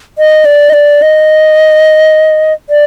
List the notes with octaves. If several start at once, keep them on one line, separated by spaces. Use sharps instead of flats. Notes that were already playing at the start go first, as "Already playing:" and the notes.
D#5
D5
D#5
D5
D#5
D5